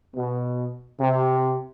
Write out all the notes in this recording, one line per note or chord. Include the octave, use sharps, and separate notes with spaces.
B2
C3